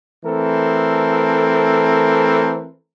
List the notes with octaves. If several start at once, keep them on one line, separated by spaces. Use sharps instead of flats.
E3 A3 C4 A4 A#4